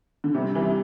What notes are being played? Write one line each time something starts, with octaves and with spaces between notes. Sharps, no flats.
D3
C3 G3
E3 G3